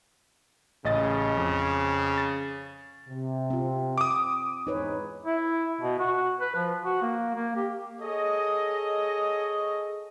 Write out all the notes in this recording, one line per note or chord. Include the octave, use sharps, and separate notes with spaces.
A1 C#3 D#5 A6
F2
A6
C3
C4 F4
D6 D#6
E2 G#2 G#3 D#4 B4 C#5
E4
B2
F#4
B4
F3
F#4
A#3
A#3
G4
G#4 A4 C#5 D#5